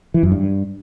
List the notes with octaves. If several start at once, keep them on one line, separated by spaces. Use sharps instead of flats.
E3
F#2
G2